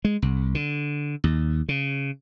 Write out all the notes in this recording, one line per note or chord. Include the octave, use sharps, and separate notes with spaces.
G#3
C2
D3
D#2
C#3